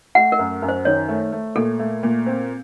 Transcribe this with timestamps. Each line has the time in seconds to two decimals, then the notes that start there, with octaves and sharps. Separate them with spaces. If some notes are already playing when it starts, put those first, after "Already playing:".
0.15 A3 F#5
0.32 A#4
0.39 F#2
0.62 F#2
0.68 C5
0.85 D#3 C#5
1.08 A3
1.32 A3
1.56 A#2 A4
1.79 A3
2.03 A#2
2.26 C4